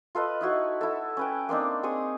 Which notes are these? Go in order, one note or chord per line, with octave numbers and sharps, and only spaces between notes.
F4 A4 B4 D#5
D#4 E4 F#4 C#5
E4 A4
C#4 B4 G5
A#3 C4 D4 D#4
C4 G#4 C#6 D#6